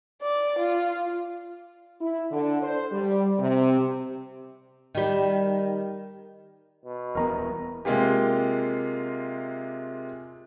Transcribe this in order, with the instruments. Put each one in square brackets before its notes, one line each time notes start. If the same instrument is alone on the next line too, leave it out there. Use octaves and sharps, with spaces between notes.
[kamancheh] D5
F4
[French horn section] E4
D3
C5
G3
C3
[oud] D#3 G3
[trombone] B2
[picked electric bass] D#1 E3 B3 [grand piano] A#4 D#5 A#5
[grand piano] C3 G#3 A#3 F4 G4